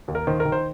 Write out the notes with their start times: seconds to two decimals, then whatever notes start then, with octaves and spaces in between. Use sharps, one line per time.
0.08 D#2
0.15 A#4
0.27 D#3 C5
0.40 A#4
0.45 D#3
0.52 C5